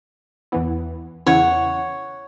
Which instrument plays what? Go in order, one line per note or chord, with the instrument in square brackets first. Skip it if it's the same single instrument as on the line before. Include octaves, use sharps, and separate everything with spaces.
[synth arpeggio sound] E2 E3 B3 E4
[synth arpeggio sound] E2 C#3 E3 C#4 E4 [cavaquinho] C#5 F#5